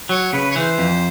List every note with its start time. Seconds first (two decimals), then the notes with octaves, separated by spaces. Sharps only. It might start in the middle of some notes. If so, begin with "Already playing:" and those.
0.09 F#3 C#5
0.33 C#3 B4
0.51 C#5
0.56 E3 C5
0.78 F2